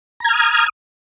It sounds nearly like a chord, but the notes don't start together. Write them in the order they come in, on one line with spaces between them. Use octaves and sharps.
A#5 G#6 F6 D#6